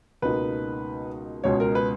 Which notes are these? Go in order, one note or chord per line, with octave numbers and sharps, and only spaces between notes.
C#2 B2 A#3 D#4 B4
C#2 B2 G#3 C#5
A#4
B4